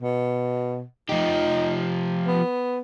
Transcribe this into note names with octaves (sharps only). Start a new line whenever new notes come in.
B2
F3 D#4 G4
B3